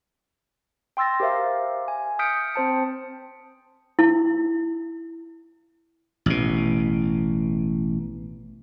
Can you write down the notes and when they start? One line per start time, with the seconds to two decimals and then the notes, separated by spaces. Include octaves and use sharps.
0.97 G5 C6 E6 A6 A#6
1.20 G4 A#4 C5 E5 F5
1.88 G#5
2.19 D#6 F6 G6 B6 C#7 D7
2.54 C4 C5 A5 C#7
3.99 E4
6.26 A1 B2